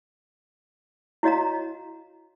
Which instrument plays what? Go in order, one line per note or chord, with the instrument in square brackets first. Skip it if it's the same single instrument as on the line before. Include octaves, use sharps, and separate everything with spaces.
[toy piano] E4 F#4 C#5 D#5 F5 A#5